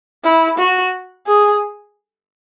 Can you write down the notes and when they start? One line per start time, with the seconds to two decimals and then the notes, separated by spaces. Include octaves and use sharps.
0.24 E4
0.58 F#4
1.27 G#4